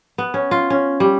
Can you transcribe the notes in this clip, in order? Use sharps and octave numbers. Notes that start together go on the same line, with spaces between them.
B3
C#4
F4
C#4
G3